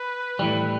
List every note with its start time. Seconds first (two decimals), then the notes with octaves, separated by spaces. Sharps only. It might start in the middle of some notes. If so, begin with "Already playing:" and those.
Already playing: B4
0.39 A2 E3 G3